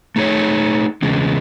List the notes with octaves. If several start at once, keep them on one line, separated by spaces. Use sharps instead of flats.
A3 D#4 G#4 C#5
E2 C#3 G#3